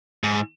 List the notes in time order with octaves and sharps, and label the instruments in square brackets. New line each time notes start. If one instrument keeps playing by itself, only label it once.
[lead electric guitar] G#2